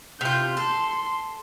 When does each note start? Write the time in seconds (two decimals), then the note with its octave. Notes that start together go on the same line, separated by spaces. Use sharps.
0.21 C3 F4 G6
0.57 A4 C6